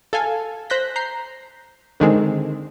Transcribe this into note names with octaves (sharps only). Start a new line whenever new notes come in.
A4 F5 G#5
C5 F#6 G6 A#6 B6
A#5 G6 C7
D3 D#3 G#3 C4